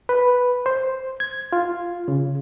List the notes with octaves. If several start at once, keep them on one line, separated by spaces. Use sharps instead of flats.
B4
C5
G#6
F4
C#3